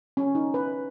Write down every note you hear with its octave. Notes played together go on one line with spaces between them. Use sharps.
C#4
D#4
B4